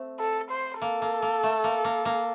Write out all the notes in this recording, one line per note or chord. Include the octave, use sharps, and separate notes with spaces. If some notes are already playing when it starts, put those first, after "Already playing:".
Already playing: A3 C4
A4
C5
A#3 A4
A#3
A#3
A3
A#3
A#3
A#3